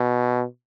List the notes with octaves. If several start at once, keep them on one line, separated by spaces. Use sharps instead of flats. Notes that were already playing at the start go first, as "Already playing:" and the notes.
Already playing: B2